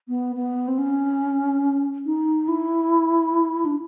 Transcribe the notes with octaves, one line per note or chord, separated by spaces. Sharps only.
B3
B3
C4
C#4
D#4
E4
D4